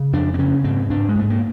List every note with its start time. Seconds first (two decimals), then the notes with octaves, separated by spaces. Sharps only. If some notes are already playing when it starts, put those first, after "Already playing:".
Already playing: C#3
0.13 F2 D4
0.34 C4
0.38 C#3 C#4
0.64 G#2 C4
0.90 G#2 D4
1.09 G#3
1.15 G#2 A3
1.30 A#3